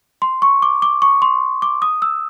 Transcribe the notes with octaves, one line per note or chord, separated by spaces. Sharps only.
C6
C#6
D6
D6
C#6
C6
D6
D#6
E6